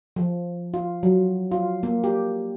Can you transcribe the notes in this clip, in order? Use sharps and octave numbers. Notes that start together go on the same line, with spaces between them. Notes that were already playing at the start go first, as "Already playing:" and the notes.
F3
F4
F#3
F4
A#3
G4